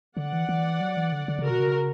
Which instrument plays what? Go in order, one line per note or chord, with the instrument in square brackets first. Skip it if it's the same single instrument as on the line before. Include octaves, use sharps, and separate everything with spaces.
[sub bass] D3 [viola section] D5 F#5
[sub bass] E3
E3
F#3
E3
D3
D3
C#3
[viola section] F#4 A#4
[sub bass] B2
C#3